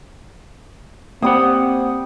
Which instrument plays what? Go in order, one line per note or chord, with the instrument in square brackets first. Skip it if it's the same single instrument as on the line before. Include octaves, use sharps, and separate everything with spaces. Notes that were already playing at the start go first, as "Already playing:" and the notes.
[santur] G3 G5 D#6 [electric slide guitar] A#3 F#5 [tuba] C4